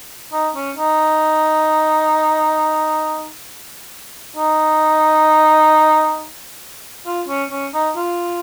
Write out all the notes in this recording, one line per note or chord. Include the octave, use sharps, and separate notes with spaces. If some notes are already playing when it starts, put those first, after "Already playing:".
D#4
C#4
D#4
D#4
F4
C#4
C#4
D#4
F4